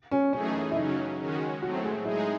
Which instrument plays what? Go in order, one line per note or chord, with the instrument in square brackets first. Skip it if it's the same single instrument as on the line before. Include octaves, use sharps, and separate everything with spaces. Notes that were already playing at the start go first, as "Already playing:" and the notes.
[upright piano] C#4
[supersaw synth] F#2 E3 A3 D#4 G#4 [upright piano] C#4
[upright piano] E4
[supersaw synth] C#3 F#3 C#4 [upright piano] D#4
[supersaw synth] D#3 G#3 C#4 F#4
[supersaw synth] A2 F#3 A3 C4 [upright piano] F#4
[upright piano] G#4
[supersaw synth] G#3 D#4 G#4 [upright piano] E4